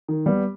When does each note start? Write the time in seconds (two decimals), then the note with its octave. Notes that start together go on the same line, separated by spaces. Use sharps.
0.08 D#3
0.26 G3 B3